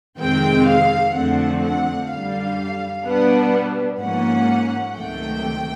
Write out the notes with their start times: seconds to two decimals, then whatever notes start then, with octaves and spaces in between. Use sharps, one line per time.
0.18 F2 C3 D#3 G#3 C4 G5
0.67 F5
1.14 F2 D3 F3 A3 C4 F#5
1.62 F#5
2.10 F#2 D3 G3 F5
3.05 B2 G3 B3 D4 F#5
4.00 G#2 F3 A#3 C#4 F#5
4.96 C#2 C3 D#3 F#3 A3 G5